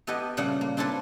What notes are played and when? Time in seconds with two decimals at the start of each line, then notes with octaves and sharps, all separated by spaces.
0.07 B3 E4 G4 A4 B4 D#5
0.37 A#2 C#3 G3 A3 F#5
0.61 A#3
0.77 C4 D4 E4 F4 A4 B4